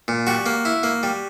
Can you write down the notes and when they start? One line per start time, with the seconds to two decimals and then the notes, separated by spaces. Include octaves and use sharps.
0.08 A#2
0.27 G3 F#4
0.46 A#3
0.65 E4
0.83 A#3
1.03 G3